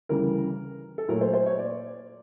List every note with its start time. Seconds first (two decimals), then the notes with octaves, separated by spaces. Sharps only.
0.09 D2 C#3 E3 G3 A#4
0.98 A4
1.08 A#2 F#3 A3 A#4
1.21 C5
1.33 C5
1.46 C#5
1.58 D5